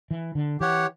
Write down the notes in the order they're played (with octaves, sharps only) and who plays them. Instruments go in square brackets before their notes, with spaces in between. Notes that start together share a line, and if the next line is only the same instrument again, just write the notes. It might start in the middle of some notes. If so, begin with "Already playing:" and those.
[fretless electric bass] E3
D3
[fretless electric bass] E3 [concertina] G4 C#5 F#5